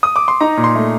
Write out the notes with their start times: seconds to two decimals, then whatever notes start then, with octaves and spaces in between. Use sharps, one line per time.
0.03 D#6
0.16 D6
0.28 C6
0.41 D#4 A#5
0.57 A#2
0.64 C6
0.75 A3